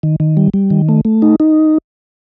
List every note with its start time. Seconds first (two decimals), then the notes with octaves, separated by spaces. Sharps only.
0.03 D#3
0.20 D#3
0.37 G3
0.54 G3
0.70 D#3
0.89 A3
1.05 A3
1.22 D#4
1.40 D#4